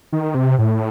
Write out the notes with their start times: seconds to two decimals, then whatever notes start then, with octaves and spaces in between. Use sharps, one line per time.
0.12 D#3
0.35 C3
0.59 A2